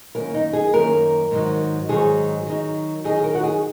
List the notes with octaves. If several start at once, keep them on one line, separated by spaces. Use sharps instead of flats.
F#2 D#3 A#3 C#4 A#4
D#4
G#4
F#2 D#3 A#3 C#4 A#4
G#2 D#3 F#3
G#2 D#3 F#3 G#4
D#3 F#3 D#4
D#3 F#3 D#4 G#4
A#4
F#4
G#4